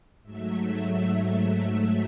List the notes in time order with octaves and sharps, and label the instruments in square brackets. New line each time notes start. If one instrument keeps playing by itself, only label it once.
[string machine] G#2 F#3 A3 E5